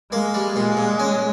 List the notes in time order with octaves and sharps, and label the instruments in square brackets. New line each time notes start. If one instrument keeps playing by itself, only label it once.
[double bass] G#3 [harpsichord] A#3
[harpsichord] G3
[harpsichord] A#2 [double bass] G#3
[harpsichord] A#2
C#4